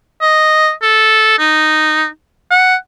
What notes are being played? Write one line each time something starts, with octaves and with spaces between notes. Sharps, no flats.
D#5
A4
D#4
F#5